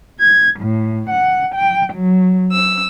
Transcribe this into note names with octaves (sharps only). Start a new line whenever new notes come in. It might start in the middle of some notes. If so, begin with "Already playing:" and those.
G#6
A2
F#5
G5
F#3
E6